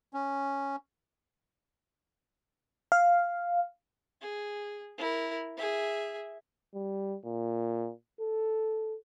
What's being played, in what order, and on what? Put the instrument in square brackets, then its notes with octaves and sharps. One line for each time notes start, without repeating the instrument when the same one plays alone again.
[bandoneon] C#4
[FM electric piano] F5
[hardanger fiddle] G#4
E4 A#4
G#4 E5
[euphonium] G3
A#2
A4